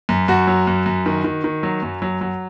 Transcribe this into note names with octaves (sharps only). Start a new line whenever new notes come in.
F#2
F#2 F#4
F#3
F#2
F#2
D#3
D#3
D#3
F#3
F#2
F#3
F#3